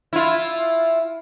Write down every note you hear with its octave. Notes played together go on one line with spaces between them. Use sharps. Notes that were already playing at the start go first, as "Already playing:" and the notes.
E4 F4